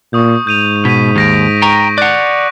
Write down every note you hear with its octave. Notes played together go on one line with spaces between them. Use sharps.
A#2 C#6 D#6 G6
G#2 G6 D#7 F7
B2 B6 D#7
D#2 G6 A#6 D7
G5 A#5 C#6
D5 F#5 F#6 F7